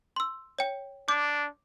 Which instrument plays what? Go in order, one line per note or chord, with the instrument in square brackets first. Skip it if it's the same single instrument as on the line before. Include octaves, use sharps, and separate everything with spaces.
[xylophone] C6 E6
C#5 G5
[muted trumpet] D4 [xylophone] D6 G6